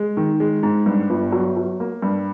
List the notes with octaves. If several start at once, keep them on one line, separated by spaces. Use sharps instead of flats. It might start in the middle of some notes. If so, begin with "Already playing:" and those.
Already playing: G#3
D#3
G#3
G#2
G2
G1
F#3
F#3
A#3
G2